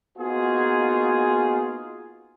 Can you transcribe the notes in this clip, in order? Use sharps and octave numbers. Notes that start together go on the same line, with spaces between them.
A#3 B3 D#4 F4 F#4 G#4